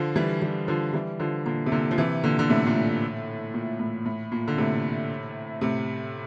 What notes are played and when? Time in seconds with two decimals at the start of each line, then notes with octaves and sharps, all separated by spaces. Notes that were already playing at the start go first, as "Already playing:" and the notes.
Already playing: D3 F3
0.16 E3 G3
0.42 E3 G3
0.68 D3 F3
0.94 E3 G3
1.19 D3 F3
1.46 A#2 D3
1.66 C3
1.72 A#2 D3
1.91 F3
1.98 C3 E3
2.24 A#2 D3
2.39 D3
2.50 A2 C3
2.66 A#2
2.75 A2
3.54 A#2
3.79 A2
4.05 A2
4.32 A#2
4.48 D3
4.58 A2 C3
5.61 A2 C3